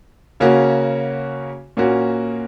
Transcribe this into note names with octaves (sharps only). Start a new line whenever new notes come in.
C#3 A#3 C#4 F#4
A#2 A#3 C#4 F#4